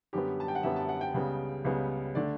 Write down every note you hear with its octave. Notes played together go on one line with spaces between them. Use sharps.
F#2 D3 G3 B3 G4
A5
G5
F#5
F#2 D3 G3 B3 E5
A5
F#5
G5
C#2 C#3 G3 B3
C#2 C#3 G3 B3
D3 A3 D5